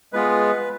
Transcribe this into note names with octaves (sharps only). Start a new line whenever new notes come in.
G#3 B3 F4 G#4 B4